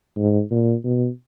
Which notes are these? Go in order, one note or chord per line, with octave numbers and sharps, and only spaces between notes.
G#2
A#2
B2